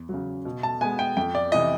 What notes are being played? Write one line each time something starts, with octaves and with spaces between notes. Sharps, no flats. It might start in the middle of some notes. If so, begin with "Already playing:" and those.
Already playing: E2
C#3 F#3
B2
A5
G#3 B3 G#5
G5
F2 G5
D5
C3 E3 D#5